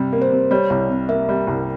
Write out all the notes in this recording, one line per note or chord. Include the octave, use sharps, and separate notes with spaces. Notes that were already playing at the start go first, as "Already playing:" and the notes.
Already playing: C3 G3
A#3
C5
C3
G3 C#5
C2
C3
A#3 E5
G3
C2